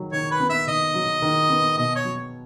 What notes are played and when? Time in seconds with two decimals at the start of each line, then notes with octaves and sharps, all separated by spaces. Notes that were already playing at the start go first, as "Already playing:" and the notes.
Already playing: D#3 F#3
0.12 D#3 C#5
0.30 B4
0.40 B3
0.49 E5
0.67 D#3 D#5
0.94 F#3
1.22 D#3
1.50 B3
1.77 B2 D#5
1.96 C#5
2.04 F#3